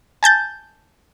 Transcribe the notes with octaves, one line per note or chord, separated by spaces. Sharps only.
G#5 A5 G6 A6